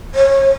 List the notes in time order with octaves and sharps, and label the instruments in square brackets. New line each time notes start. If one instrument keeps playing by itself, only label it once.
[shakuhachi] C#5